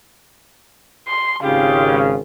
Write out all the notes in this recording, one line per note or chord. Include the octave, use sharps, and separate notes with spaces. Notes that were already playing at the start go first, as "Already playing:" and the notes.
C6
G#1 C#3 F4 G4 F5